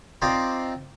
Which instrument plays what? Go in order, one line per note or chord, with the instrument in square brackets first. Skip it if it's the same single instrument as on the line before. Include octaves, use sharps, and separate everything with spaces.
[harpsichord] C4 D#4 F4 C5 D5 G5